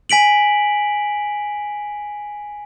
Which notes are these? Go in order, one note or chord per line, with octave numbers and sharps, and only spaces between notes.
G#5 B6 D7 F#7